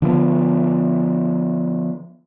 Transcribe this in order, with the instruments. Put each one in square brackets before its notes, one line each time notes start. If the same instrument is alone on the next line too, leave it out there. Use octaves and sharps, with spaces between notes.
[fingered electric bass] D3 F3 G#3 B3